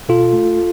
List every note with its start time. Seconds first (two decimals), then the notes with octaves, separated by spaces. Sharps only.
0.09 B2 F4 A4
0.33 A3